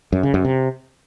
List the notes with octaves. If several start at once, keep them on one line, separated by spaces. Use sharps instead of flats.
F#2
C#3
F#2
C3